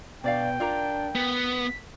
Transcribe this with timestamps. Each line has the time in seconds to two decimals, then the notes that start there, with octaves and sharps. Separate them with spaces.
0.24 B2 D4 D5 F5 G5
0.60 D4 F4 A#4 A#5
1.15 B3 B6